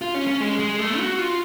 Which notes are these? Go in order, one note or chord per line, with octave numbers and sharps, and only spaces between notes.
F4
C#4
C#4
G#3
G#3
A3
F#4
F4